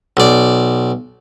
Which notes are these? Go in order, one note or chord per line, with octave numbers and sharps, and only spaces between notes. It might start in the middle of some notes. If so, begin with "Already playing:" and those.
B1 D5